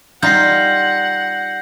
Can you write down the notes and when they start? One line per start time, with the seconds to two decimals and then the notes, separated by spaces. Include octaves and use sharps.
0.23 G3 D#4 F4 F#5 G6 A#6 C7